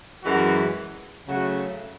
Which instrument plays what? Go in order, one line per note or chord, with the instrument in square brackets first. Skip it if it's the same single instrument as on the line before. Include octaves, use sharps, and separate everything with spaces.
[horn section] F#2 E3 G#3 F#4
C#3 F#3 A3 F#4